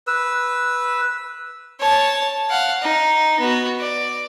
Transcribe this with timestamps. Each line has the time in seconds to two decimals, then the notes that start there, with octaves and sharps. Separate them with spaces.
0.07 B4 E6
1.79 C#5 A5
2.50 F5 F#5
2.82 D#4
3.39 B3 F#4
3.80 D5